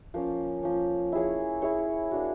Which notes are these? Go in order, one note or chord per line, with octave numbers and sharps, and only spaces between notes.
F3 A#3 C#4
F3 A#3 C#4
E4 G#4 C#5
E4 G#4 C#5
A#3 D4 F#4